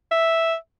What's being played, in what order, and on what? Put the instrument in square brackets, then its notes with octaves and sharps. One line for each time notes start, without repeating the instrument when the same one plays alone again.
[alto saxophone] E5